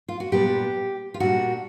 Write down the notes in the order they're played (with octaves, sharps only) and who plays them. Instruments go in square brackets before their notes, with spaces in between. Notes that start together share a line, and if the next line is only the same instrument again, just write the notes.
[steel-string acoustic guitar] F4
F#4
A#2 G3 B3 D4 G4
F4
A#2 G3 B3 D4 F#4